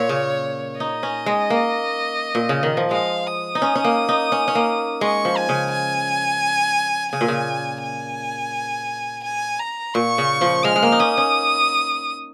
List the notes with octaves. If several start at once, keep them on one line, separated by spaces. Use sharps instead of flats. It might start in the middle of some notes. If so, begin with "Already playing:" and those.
Already playing: A#2 C#5
C#3
D#4 D#5
C#4
G#3
A#3
A#2
C#3
D#3
F3
G#3 F5
D#6
D#4
C#4
C#4
A#3
D#4
C#4
C#4
A#3
G#3 C#6
F3
G#5
C#3
G#5
C#3 G#5
A#2
C#3
G#5
G#5
A#5
A#2 C#6
C#3
F3
G#3 F6
G#3
A#3
D#4
C#4 D#6
C#4